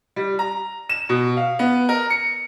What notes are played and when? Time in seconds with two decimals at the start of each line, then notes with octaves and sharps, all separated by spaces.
0.16 G3
0.39 A#5
0.89 E7
1.09 B2
1.37 F5
1.59 B3
1.89 A#4
2.10 C#7